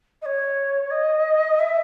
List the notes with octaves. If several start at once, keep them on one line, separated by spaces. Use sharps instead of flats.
D#5
C#5
D#5
E5